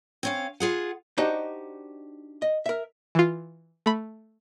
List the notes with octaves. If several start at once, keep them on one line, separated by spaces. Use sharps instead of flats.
C4 C#4 F5
F4 G#4 F#5
D4 D#4 F#4 G4 C5 D#5
D#5
A#4 E5
E3 F4
A3 B5